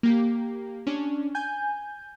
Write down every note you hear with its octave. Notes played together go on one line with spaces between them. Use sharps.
A#3 G4
C#4 D4
G#5 G6